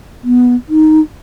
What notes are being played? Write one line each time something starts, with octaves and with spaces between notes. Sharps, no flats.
B3
D#4